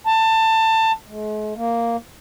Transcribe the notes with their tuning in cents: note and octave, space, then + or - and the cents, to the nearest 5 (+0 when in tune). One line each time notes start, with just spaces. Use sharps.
A5 +20
G#3 +45
A#3 -5